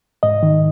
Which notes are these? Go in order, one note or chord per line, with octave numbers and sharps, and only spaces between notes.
G#2 D#5
D#3